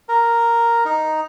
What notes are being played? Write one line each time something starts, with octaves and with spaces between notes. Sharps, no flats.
A#4
D#4